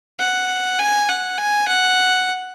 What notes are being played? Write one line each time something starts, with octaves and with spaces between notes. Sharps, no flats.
F#5
G#5
F#5
G#5
F#5